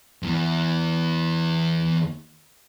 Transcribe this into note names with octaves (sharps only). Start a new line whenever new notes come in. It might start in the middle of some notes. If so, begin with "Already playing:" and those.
E2 E3